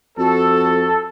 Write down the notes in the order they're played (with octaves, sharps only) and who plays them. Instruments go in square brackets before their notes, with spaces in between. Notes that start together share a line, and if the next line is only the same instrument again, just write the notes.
[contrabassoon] F2 [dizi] F#4 [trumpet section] A4